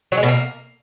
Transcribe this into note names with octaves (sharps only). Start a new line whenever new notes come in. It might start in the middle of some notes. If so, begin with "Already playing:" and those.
F#3
G#3
B2
A#3